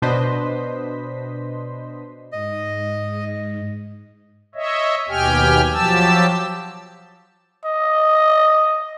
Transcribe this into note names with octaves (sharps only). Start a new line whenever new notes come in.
B2 D4 B4 C5 D#5 B6
G#2 D#5
C#5 D#5 E5
D#2 B2 G4 G5 G#5 F6
F3 F#3 G4 A5 E6
D#5